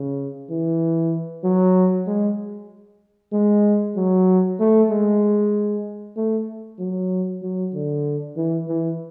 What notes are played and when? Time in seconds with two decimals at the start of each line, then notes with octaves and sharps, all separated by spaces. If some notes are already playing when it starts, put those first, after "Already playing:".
Already playing: C#3
0.50 E3
1.44 F#3
2.07 G#3
3.32 G#3
3.96 F#3
4.60 A3
4.90 G#3
6.16 A3
6.79 F#3
7.42 F#3
7.74 D3
8.36 E3
8.68 E3